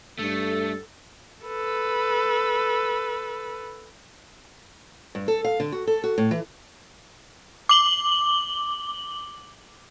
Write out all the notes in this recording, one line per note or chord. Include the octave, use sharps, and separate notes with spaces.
G2 A3 A4
A4 B4
G2
A4
F5
D3
F#4
A4
F#4
A2
E3
D6 F#7 G7